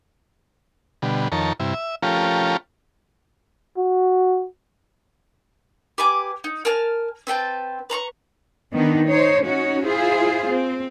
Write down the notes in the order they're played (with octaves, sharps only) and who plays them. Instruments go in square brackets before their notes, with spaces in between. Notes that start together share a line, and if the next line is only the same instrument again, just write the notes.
[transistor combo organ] B2 D3 G3
F2 D#3 A#4 C#5 A5
G2 C3 E4
E5
F3 A3 C#4 F4 G4 A#4
[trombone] F#4
[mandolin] G4 B4 G#5 D6
D#4
A#4 G#5 A5 F6
C4 B4 G5 A5
B4 A#5 C6 C#6
[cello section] D#3 B3 D4 D#4
D#4 C5 C#5
C#4 D#4 F#4 C#5
E4 F4 G#4 C5
C4